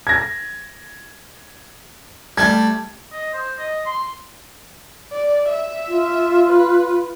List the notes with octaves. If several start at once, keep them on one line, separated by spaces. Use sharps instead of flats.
G#6 A#6
G3 A3 G#6
D#5
C5
D#5
C6
D5
E5
F4
B4